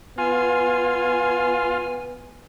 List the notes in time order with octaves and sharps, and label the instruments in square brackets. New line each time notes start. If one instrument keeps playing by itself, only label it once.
[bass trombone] B3 [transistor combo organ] F4 [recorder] G#5